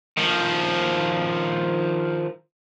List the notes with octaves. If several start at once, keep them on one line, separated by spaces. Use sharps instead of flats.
D#3 F3